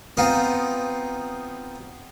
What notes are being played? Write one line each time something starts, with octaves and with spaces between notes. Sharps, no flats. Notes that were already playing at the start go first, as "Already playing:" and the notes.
B3 C4 D#4 F4